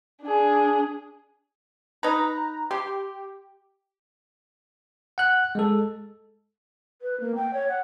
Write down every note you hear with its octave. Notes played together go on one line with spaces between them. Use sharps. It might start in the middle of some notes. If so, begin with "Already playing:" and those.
D4 G#4
D#4 B4 A#5
G4 C6
F#5 F#6
G#3 A4
B4
A#3
G5
C#5
F#5